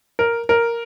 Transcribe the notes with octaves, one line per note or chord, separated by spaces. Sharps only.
A#4
A#4